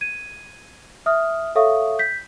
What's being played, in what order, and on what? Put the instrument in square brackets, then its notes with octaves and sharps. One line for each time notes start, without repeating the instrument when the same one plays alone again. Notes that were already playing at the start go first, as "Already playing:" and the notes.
[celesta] G#6 D#7
E5 D#6 F6
A4 C#5 E5 F5 C#6 D#6
G6 B6